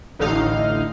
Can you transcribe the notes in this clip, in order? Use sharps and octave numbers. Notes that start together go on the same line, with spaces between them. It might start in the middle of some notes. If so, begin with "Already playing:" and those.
A1 A2 D3 D#4 F5